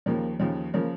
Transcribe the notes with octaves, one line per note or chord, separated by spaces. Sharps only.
D#2 C#3 F3 A#3
D#2 C#3 F3
C#3 F3 A#3